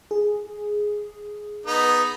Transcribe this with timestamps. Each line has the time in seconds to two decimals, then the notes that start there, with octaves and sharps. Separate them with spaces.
0.11 G#4
1.66 B3 D#4